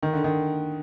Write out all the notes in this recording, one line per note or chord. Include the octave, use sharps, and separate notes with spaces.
D#3
D3
D#3